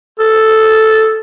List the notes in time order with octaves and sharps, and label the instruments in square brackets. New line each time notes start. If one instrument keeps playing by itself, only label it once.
[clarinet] A4